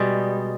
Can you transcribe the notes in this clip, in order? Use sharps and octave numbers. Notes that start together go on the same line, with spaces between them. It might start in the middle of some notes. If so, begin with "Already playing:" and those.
Already playing: B2 G3 G#3 G#4